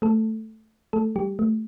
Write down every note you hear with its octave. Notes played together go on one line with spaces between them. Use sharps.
A3 A4
A3 A4
G3 G4
A3